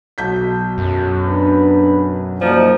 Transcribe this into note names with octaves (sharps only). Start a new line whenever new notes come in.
B1 G6 B6
F#2
D4 B4
F3 F#3 A#3 D#4 D5